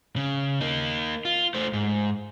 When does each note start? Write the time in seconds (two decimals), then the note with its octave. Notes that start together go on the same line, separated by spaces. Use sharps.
0.16 C#3
0.61 A#3 D#4
1.25 F4
1.54 A3 C5
1.73 G#2